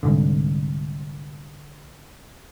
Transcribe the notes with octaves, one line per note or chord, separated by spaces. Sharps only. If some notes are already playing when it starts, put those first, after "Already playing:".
C2 G#2 D3